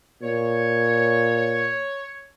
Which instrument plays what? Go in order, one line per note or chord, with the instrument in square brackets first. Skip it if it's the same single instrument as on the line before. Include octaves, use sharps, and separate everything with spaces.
[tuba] A#2 [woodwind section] C#5